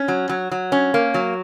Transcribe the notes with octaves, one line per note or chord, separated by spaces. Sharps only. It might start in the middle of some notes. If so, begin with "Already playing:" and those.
Already playing: C#4
F#3
F#3
F#3
C#4
A#3
F#3